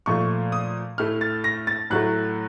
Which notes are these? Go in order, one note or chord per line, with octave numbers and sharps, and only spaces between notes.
A#2 F3 A3 C#6
D#6
A2 A3 F6
A6
A#6
A6
A2 F#3 A3 F#6